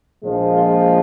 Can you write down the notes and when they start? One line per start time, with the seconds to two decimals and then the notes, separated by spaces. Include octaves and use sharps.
0.24 A#1 A#2 F3 G#3
0.53 F4